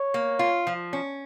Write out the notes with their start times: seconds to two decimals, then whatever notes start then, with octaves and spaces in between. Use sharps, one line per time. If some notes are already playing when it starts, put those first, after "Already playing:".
Already playing: C#5
0.14 A#3
0.39 F4
0.67 F3
0.93 C#4